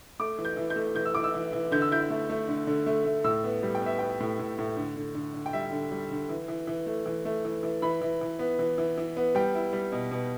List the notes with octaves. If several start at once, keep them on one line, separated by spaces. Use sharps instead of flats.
A3 D6
E3
G6
E3
G6
A3
E3 G6
E6
E3 D6
E6
E3
E3
D3 G6
E6
E4 G6
A3
A3
D3
D3
A3
A3
A2 E6
B3
G3
G5
B3 E5
B3 G5
A2
A2
A2
D3
D3
D3
D3
G5
G3 E5
D3
G3
D3
E3
E3
E3
A3
E3
A3
E3
E3
E3 B5
E3
E3
B3
E3
E3
E3
B3
G3 G5
E4
G3
B2
B2